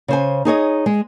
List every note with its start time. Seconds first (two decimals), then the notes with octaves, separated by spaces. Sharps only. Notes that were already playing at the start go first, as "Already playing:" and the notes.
0.08 C#3 C5 G#5
0.45 D#4 G#4 C#5 D#5
0.86 G#3